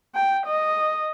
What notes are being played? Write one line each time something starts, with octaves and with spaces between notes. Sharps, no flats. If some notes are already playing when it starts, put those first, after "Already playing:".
G5
D#5